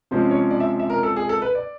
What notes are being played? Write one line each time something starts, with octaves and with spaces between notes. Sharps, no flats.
C3 F3 G#3 C#4 C5
C#5
D5
E5
E5
A#4
A4
G#4
A4
B4
D5